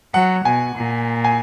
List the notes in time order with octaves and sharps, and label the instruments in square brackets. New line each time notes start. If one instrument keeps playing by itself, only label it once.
[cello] F#3 [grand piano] F#5
[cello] B2 [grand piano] G#5
[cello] A#2
[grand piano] G#5